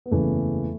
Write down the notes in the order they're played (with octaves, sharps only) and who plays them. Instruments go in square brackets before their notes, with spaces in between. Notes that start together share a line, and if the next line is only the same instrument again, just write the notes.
[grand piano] B3
F#1 E2 C#3 E3 A3